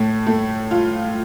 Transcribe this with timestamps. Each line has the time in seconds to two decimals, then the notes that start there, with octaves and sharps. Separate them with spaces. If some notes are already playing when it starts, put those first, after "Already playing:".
Already playing: A2 A3
0.27 A3
0.71 F4